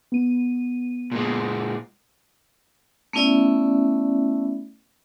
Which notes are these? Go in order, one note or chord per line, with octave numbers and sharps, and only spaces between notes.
B3 D#7
A#2 G#3
A3 B3 C#4 E4 D5 E5